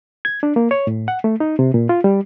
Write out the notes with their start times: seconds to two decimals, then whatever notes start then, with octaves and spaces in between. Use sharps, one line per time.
0.25 G#6
0.43 D4
0.56 A#3
0.71 C#5
0.87 A2
1.08 F#5
1.24 A3
1.40 D#4
1.59 C3
1.74 A#2
1.89 F4
2.04 G3